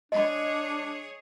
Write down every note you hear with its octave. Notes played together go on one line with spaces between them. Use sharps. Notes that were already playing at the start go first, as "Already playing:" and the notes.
D4 G#4 C#5 D#5 B5